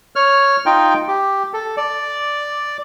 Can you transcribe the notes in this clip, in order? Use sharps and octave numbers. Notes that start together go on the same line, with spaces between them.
C#5 F6
D#4 F4 G5
G4
A4
D5